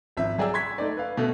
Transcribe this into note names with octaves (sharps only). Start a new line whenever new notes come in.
G#1 F3 E5
F#3 G#4 D5 G5 E6
C6 C#6 G#6 B6
A3 D#4 D5
B4 F5
B2 A3